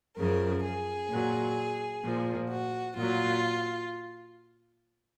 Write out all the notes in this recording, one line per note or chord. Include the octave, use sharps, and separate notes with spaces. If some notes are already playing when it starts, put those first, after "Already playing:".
F#2 C#3 F3 A#4
G#4
A#2 F#3
A#2 F3
F#4
A#2 F#3 F4